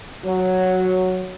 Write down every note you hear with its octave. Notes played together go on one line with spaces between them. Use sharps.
F#3